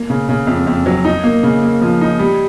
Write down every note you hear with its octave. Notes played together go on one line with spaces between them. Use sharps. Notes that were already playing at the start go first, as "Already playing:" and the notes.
Already playing: A#3
C#3
C#3
F2
F2
F#3
D#4
A#3
C#3
A#3
F3
D#4
G3